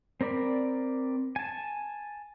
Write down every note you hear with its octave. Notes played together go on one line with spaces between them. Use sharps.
C4 A#4 D5 B5
G#5 A5